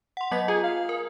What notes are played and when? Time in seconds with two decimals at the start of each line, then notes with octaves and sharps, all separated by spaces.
0.17 F#5 C6
0.31 F#3 B3 D#5 B6
0.48 F4 G#4
0.63 F5
0.89 A#4